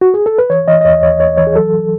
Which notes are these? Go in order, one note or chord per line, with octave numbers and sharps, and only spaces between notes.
F#4
G#4
A4
B4
E3 C#5
E3 D#5
D#5
D#2 C#5
D#2 C#5
D#2 C#5
E3 C#5
G#4
F#3 A4